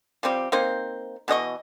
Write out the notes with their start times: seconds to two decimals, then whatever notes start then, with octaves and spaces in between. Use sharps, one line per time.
0.23 F3 G3 C4 G4
0.52 A#3 C4 D#4 C5
1.28 B2 E3 D#5 C#6